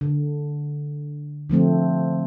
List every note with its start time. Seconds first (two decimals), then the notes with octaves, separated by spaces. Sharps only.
0.01 D3
1.50 D3 F3 A3 C4